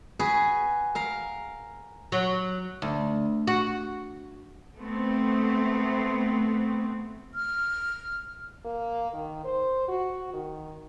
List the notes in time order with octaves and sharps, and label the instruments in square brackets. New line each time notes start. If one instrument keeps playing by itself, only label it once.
[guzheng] F#4 G#4 B4
A#4 F5
[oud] F#3
D2
F#4
[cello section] A3 B3 C4
[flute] F6
[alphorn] A#3
D#3
C5
F#4
D#3